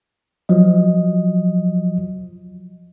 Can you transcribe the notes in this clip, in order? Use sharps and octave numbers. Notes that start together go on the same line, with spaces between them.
F3 F#3 D#5